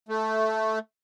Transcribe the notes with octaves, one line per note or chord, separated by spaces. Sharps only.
A3